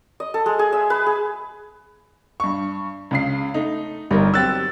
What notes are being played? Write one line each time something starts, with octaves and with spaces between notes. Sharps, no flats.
D#5
A4
G#3
G#4
E5
B4
G#4
G2 C#6
C#2 C#3 C7
A3 D#4
G1 G3 D#4 A#4
F#3 C4 G4 E6 F#6 A6